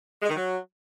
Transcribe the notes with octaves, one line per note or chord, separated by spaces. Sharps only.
G#3
D#3
F#3